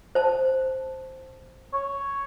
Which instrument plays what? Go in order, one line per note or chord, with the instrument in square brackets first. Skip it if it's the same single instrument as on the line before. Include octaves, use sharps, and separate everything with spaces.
[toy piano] C5 A5
[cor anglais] C#5